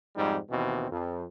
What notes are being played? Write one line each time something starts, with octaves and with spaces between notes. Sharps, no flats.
F2 G#2 G3 D#4
D#2 B2 E3 C4
F2